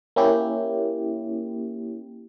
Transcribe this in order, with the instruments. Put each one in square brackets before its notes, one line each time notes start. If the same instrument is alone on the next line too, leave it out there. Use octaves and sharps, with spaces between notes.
[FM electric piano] A#3 C#4 E4 G4